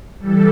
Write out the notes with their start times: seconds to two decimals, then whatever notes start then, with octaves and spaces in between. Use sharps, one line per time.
0.19 E3 G3 A4